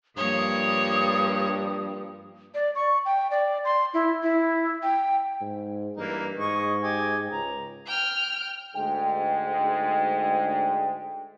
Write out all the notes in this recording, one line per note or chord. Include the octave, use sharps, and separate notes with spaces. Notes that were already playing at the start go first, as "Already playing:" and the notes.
G2 F3 G3 A#3 C#5 D#6
D5
C#6
G5
D5
C6
E4
E4
G5
G#2
G2 E3 A#3 D#4
G#2 G#4 D#5 C#6
G4 D#5 G#5
C#2 A#5
G5 F6
D2 G#2 G#3 G5